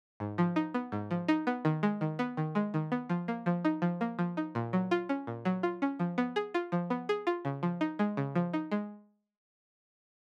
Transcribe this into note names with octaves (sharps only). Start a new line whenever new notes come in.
G#2
F3
D#4
B3
G#2
F3
D#4
B3
D#3
G#3
D#3
B3
D#3
G#3
D#3
B3
F3
A#3
F3
D#4
F3
A#3
F3
D#4
A#2
F#3
F4
C#4
A#2
F#3
F4
C#4
F3
B3
G#4
F4
F3
B3
G#4
F4
C#3
F3
D#4
G#3
C#3
F3
D#4
G#3